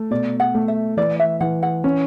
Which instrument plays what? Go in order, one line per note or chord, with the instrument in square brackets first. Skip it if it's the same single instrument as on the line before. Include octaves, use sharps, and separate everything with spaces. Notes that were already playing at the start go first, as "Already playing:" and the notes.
Already playing: [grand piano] A3
[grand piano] B2 [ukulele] D5
[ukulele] F#5
[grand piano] A3
[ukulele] E5
[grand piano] E3 [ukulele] D5
[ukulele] E5
[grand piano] E3 [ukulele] F#5
[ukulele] F#5
[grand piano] C#4